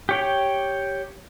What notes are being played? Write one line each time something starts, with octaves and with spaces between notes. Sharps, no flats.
G4 C#5 G5